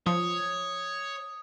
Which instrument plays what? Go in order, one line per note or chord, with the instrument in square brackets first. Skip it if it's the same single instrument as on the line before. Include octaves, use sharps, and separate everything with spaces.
[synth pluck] F3 [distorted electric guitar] C#5 [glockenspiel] D#6